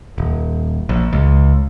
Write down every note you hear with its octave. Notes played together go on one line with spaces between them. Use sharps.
D#1
A#1
C#2